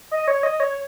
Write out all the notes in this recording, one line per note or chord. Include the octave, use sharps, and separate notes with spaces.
D#5
C#5
D#5
C#5